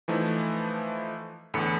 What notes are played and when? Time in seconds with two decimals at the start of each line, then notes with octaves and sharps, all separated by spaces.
0.08 E3 F3 A3 D#4 E4
1.54 E2 A2 D3 A4 B5 C#7